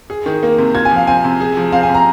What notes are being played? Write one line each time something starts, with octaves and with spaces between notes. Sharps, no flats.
G#4
D#3
A#3
C3
F4 G#6
G#5
F3 F5
C4 G#5
C3
G#4
F3
C4 F5
G#5
C3
A#5